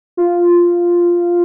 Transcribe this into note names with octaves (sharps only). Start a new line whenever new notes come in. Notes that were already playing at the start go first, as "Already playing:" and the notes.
F4